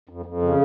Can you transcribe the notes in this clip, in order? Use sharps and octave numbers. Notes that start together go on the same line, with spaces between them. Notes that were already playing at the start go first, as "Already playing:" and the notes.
F2
F2
C#3